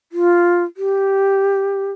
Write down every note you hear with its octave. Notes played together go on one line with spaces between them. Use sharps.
F4
G4